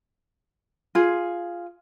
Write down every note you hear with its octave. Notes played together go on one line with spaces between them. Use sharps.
F4 G#4